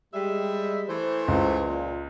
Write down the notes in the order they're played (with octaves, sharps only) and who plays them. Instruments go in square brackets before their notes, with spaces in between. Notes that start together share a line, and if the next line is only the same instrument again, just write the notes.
[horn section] G3 G#3 E5
E3 A3 C5
[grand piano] C#2
[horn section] A#2